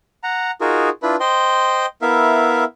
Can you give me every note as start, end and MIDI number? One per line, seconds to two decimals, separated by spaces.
0.23 0.51 78
0.23 0.51 82
0.61 0.90 63
0.61 0.90 65
0.61 0.90 66
0.61 0.90 68
0.61 0.90 70
1.03 1.16 62
1.03 1.16 64
1.03 1.16 65
1.03 1.16 71
1.20 1.86 72
1.20 1.86 75
1.20 1.86 79
1.20 1.86 84
2.02 2.64 59
2.02 2.64 64
2.02 2.64 70
2.02 2.64 76
2.02 2.64 77